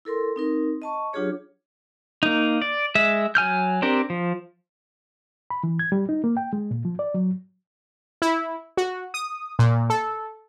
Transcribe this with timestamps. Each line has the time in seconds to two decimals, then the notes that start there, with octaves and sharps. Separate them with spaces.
0.05 E4 A4 A#4 C6
0.36 C4 D#4 A#4
0.82 D#5 A5 C#6
1.13 F#3 D4 F4 G4 G#4 C#5
2.23 A#3 D#4
2.62 D5
2.95 G#3 E5
3.35 F#3 G#5 F6 G6
3.82 C4 D4 G4 A#4
4.10 F3
5.50 B5
5.63 E3
5.79 G#6
5.92 G3
6.09 D#4
6.24 A#3
6.37 G5
6.53 G#3
6.71 A#2
6.85 F3
6.99 D5
7.14 F#3
8.22 E4
8.77 F#4
9.14 D#6
9.59 A#2
9.90 A4